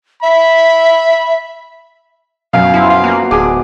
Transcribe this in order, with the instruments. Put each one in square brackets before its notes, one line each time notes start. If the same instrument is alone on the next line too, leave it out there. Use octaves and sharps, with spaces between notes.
[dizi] E5 [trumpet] B5
[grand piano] F#2 [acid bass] B2 [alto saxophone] F5
[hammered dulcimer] B2 F3 C6 [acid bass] E4
[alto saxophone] F5
[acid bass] A#3 [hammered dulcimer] F#5
[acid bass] D1 [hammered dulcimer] G#2 D4 [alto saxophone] G#4 [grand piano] D6